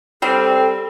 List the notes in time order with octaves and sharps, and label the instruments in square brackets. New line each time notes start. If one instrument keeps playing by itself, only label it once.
[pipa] G3 [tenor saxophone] C4 [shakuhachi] A4 [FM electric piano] G5